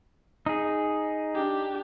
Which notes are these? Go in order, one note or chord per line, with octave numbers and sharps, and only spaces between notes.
D#4 G#4
D4 G4